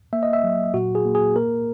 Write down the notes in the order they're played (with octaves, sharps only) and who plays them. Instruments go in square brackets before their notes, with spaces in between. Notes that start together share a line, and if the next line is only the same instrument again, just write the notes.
[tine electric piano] A#3 E5
D#5
E5
F#3
A#2 F#4
G#4
A#3
G#4
A#3 A#4